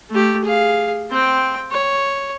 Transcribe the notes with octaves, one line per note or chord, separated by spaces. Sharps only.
A3 G4
G#4 F5
C4 G5
C#5